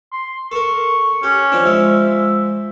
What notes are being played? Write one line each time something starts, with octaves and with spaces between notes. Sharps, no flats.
C6
A4 A#4 C#6
C#4 G4
F3 C4 D4
F3 G#3 E5